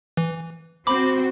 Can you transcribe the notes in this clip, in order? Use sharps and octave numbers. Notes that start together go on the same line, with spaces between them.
E3
C4 F#4 B5 D6